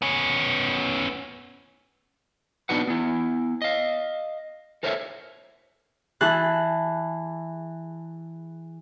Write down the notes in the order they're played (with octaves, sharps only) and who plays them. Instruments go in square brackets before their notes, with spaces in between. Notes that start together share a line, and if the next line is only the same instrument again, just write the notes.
[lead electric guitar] B3 C#4
[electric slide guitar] B3 D4 D#4 F#4 B4 F#5
B3 E4
D#5 F5
A4 A#4 C5 C#5 D#5 E5
[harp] E3 G#4 A5 F#6